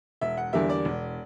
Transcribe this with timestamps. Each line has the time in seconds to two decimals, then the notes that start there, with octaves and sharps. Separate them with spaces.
0.21 E1 E5
0.37 F#5
0.53 E2 D3 G3 A#3 E5
0.69 D5
0.85 E1